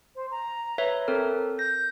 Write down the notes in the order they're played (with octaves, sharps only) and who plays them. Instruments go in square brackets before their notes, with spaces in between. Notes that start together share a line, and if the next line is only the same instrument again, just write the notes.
[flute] C5
A#5
[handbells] B4 C#5 E5
C4 A4 A#4
[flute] G6 [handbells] A#6